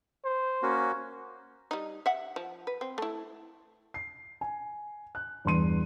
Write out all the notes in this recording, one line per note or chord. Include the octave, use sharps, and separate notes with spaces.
C5
A#3 C#4 F#4
G3 D#4
E5 F#5
F3
B4
C4
A3 E4
C7
G#5
F#6
E2 G2 C6 D#7